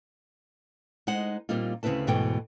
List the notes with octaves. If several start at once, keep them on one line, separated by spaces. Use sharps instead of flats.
G#3 D#4 C5 F#5
A#2 G3 A#3 C4 D#4 F4
D2 C#3 C4 E4 B4 A5
D2 G#2 B2 E3 A4 G5